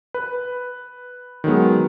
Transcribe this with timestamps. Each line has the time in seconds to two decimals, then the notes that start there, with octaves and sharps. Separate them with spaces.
0.14 B4
1.44 D#3 F#3 G#3 B3